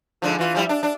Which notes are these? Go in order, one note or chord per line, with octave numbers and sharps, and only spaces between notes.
G#2 D3 F3
E3 F4
F3 G3 E4
D4
D4